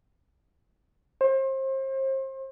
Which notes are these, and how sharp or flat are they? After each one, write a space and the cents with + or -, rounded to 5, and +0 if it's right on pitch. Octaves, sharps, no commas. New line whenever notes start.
C5 +35